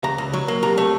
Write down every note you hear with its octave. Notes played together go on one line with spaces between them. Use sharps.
C#2 A#5
C#2
F#3
A#3
C2 A#5
A3